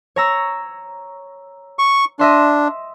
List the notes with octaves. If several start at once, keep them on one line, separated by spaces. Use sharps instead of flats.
C#5 A#5 E6
C#6
D4 D#5 E5 C6